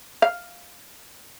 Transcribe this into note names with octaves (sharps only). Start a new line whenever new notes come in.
F5